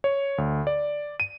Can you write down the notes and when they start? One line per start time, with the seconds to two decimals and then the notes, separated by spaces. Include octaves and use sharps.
0.04 C#5
0.38 D2
0.67 D5
1.20 D#7